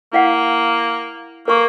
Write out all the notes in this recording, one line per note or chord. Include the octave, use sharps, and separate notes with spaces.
A#3 E4 F5 F#5
A#3 A#4 C#6